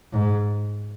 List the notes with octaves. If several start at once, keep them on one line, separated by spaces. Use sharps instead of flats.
G#2